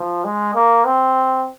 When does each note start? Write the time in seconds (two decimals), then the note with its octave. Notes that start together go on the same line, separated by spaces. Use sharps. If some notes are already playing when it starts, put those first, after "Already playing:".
Already playing: F3
0.24 G#3
0.55 A#3
0.85 C4